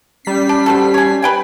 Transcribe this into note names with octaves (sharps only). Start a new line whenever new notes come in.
G3 C#4 B6 C7
D4
C4 F#4 A4
C#5 G#5
B4 G5 G#5